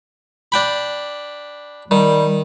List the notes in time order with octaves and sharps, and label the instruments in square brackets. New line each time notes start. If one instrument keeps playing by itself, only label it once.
[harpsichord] D4 G5 B5
[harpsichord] D#3 [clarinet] G3